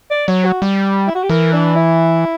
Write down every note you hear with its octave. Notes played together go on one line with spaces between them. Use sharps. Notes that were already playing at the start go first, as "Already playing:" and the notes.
D5
F#3 C#5
F#4
G3
E4
F#4
G4
E3 A#4
D4
E4